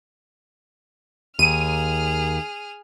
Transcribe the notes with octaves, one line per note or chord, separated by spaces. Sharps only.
D#2 G#4 F6 D#7